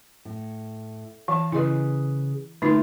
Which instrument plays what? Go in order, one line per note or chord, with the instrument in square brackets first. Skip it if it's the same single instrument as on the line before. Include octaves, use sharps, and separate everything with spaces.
[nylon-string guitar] A2
[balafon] E3 [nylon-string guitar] F5 A5
[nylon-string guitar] C#3 G#4 B4 [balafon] E4 D#5
[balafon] D3 D#4 [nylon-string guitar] A3 A#3 F4